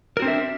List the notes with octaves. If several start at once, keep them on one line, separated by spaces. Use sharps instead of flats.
C4 D4 F#4 A#4 E5